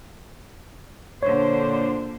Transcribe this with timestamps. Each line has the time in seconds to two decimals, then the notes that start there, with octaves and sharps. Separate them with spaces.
1.23 A#2 D3 C5 C#5